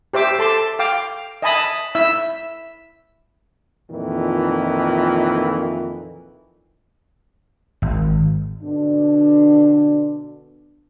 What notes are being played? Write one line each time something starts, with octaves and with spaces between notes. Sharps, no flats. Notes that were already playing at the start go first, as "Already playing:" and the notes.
G4 C5 E5 D6
A4 A5 C6 D6
F5 G5 D6
D#5 E5 G#5 A5 B5 D#6
E4 E5 E6
F2 A#2 D#3 E3
G#1
B2 D3 D4